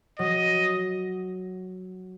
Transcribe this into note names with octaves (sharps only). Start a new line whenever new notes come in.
F#3 D#5